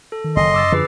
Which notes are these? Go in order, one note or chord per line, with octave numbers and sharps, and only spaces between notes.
A4
D#3
F#1 D#5 C6
F#2 D6 E6 A6
D3 F3 G#4 B4 C7